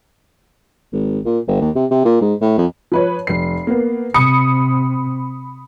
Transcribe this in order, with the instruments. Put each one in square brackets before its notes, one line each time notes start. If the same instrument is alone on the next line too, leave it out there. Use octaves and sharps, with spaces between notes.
[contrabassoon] G#1
A#2
G1
D#2
C3
C3
A#2
G#2
A2
F2
[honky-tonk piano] F3 B4 C#5
F1 C7
A#3 B3
[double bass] C3 C4 [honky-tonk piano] B5 D#6 C#7